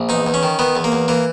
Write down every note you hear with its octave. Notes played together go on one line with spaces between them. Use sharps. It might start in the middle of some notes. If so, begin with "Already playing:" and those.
Already playing: A#1
E2 D#4
E2
C#4
D#3
D#3 B3
E2
A#3
E2
E3 A#3